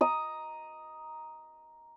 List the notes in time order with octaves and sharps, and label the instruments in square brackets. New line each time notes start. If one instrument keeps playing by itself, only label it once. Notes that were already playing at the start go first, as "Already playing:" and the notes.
[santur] A#5 D#6